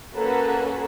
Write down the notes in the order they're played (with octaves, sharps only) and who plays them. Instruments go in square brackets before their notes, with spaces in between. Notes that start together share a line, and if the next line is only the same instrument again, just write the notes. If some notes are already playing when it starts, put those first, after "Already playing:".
[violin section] A#3 C#4 F#4 G#4 A4 B4